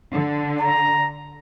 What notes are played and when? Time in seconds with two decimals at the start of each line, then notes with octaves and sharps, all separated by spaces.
0.13 D3
0.59 A#5